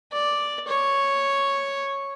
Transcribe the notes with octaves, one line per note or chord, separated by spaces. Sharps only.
D5
C#5